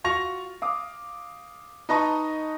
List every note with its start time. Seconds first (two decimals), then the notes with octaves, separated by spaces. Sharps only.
0.04 F4 F#4 C#6 A#6 F7
0.62 F5 D6 D#6
1.89 D#4 B4 D#5 A5 A#5 C#6